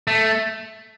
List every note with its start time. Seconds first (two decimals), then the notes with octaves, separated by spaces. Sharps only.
0.07 A3